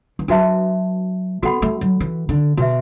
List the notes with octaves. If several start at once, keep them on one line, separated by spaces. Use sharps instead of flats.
E3
F#3 D4 F#4 B4 E5 A5
B3 F#4 A4 F#5 B5
A3
F#3
E3
D3
B2 F#4 B4 E5